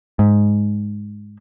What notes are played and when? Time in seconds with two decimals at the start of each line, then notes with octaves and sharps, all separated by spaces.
0.19 G#2